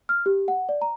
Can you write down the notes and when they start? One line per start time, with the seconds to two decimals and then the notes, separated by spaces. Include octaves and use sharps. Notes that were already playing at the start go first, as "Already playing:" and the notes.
0.09 F6
0.26 G4
0.48 F#5
0.69 D5
0.82 A#5